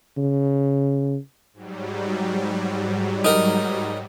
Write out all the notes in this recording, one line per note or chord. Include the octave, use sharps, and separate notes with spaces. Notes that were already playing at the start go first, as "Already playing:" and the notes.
C#3
G#2 F#3 G3
D#4 A#4